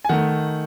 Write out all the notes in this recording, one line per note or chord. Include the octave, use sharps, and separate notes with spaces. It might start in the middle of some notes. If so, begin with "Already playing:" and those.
G#5
D#3 A3 F#5